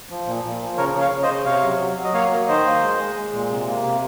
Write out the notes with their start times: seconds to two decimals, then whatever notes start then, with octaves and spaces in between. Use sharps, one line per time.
0.10 F3
0.26 A#2
0.44 A#2
0.61 F3
0.77 C#3 A#4 C#5
0.95 C#3
1.00 C#5 F5
1.11 C#3
1.23 C5 D#5
1.29 C#3
1.45 C3 C#5 F5
1.63 F#3
1.80 F#3
1.97 F#3
2.04 D#5
2.14 A#3 C#5 F5
2.31 A#3
2.48 D#3 C5 D#5
2.65 A#3
2.82 G#3
2.99 G#3
3.16 G#3
3.33 A#2
3.50 C3
3.67 A#3
3.84 C3